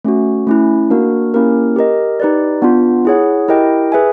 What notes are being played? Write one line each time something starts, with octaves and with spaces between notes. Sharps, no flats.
A3 C#4 F#4
A3 C#4 E4
A#3 D4 F#4 A#4
A#3 C#4 E4 G4 A#4
G4 A#4 D#5
D#4 G4 B4 D5
B3 D4 F4
E4 G#4 C#5 F#5
E4 G4 A#4 D#5 G5
G#4 B4 E5 G#5